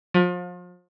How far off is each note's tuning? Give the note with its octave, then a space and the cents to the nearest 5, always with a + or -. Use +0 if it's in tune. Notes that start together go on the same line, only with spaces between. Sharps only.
F3 +35